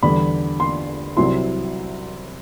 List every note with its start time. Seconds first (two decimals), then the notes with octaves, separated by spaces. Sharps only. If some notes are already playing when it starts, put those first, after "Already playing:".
0.03 E2 D3 G3 B5
0.60 C6
1.17 C2 C3 F#3 C4 E4 C6